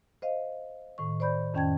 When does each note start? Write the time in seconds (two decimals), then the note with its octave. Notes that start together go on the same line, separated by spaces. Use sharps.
0.22 C5 D#5 F5
0.98 A2 D#3 C#6
1.20 C5 D5 B5 G6
1.54 F2 D#3 C#4 G5 A5 G#6